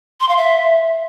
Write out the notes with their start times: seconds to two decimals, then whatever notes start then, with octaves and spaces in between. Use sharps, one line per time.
0.20 C6
0.29 F5
0.37 E5